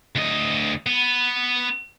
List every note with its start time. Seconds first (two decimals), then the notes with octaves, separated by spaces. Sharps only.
0.15 D2 D#5
0.87 B3